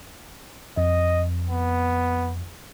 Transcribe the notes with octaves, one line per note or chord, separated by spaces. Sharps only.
F2 D#5
B3